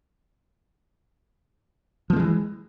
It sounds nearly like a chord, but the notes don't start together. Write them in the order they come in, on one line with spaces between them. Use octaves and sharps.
F3 A#3 G#3 E3